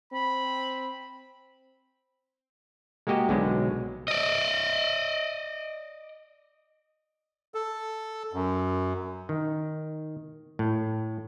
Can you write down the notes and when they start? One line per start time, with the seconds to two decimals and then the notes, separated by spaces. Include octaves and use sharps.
0.13 C4 B5
3.07 G#3 A#3 F#4 G4 D#5
3.29 B1 B2 D3 G#3
4.08 D5 D#5
7.55 A4
8.33 F#2
9.29 D#3
10.59 A2